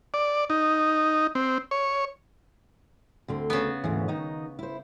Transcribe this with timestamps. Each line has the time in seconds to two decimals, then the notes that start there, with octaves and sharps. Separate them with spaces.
0.14 D5
0.50 D#4
1.35 C4
1.71 C#5
3.28 D2 D3 C4
3.50 C#3 B3
3.84 D2 G#2 E3
4.08 D#3 D#4 D#5
4.59 E4 C5